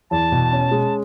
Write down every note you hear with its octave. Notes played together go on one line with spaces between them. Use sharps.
E2 A5
B2
C#4
G#3